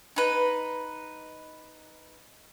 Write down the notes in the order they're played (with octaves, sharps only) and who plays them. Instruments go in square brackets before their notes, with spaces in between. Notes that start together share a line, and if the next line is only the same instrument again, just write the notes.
[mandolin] D#4 B4